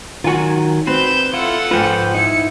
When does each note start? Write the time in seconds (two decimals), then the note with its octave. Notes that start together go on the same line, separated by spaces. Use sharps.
0.24 D#3 F#3 F4 F#4 G#5
0.87 C4 B4 G6 E7
1.33 E4 F4 A4 F#5
1.71 G#2 F3 F4 B4 C5 G5
2.15 D#4 E4 C#7